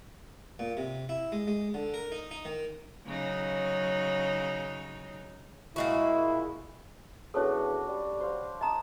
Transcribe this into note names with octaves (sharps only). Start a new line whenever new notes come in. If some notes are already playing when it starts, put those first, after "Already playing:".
A#2
C3
E4
G#3
G#3
D3
A#4
D#4
D#4
D#3
C#3 F#3 D#4
A#2 G#3 E4 F#4
E2 C#4 D4 F#4 A4 C#5
G3
C5 F5
D#5 A5 A#5 D#6